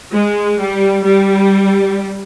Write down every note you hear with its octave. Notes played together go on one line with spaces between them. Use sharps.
G#3
G3
G3